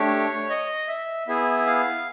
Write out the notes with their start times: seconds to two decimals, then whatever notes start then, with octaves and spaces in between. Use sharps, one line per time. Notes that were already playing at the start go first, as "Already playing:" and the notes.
Already playing: A3 D4 G4 C#5
0.49 D#5
0.88 E5
1.27 B3 E4 G#4 E5
1.66 F5